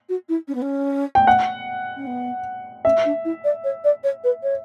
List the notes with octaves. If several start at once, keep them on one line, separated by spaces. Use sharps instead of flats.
F#4
E4
C#4
B3
C#4
G5
F#5
C#4
B3
C#4 E5
D4
E4
D5
C#5
D5
C#5
B4
C#5